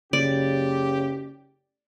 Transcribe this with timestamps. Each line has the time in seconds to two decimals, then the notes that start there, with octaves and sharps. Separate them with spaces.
0.13 F#1 C#3 G4 D5